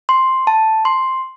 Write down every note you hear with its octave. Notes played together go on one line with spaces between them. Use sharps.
C6
A5
C6